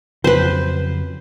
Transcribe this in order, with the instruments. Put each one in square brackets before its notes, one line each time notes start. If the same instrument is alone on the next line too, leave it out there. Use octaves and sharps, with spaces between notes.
[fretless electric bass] F2 C#3 F#3 [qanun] B4 C5